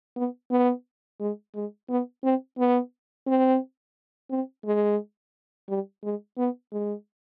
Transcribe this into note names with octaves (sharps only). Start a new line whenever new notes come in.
B3
B3
G#3
G#3
B3
C4
B3
C4
C4
G#3
G3
G#3
B3
G#3